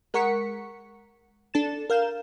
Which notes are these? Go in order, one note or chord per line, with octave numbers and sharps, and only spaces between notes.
G#3 A#4 F#5 C#6 B6 C#7
D4 A4 A6 E7
A#4 F5 G6 E7